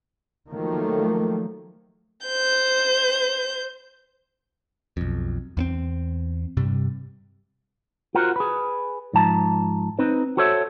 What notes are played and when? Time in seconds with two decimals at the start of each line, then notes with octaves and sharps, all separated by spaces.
0.50 D#3 F3 F#3 A3 A#3
2.27 C5 G6
4.97 B1 F2
5.57 E2 B3 C4
6.57 G2 C3 G3
8.15 F4 F#4 A#4 C5 F#5
8.36 G#4 B4
9.13 G#2 F3 A5 A#5
9.99 C4 D#4 B4
10.37 F#4 A4 C5 C#5 E5